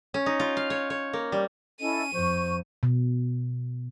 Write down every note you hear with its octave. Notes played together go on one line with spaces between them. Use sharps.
C#4
D#4
F4
F5
C#5
C#5
A#3
G3
C#4 E4 A4 D#5 D#7
F2 C5 C#6
B2